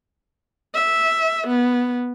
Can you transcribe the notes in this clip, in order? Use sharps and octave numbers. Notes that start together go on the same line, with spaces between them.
E5
B3